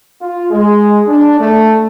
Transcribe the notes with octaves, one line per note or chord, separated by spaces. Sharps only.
F4
G#3
D4
A3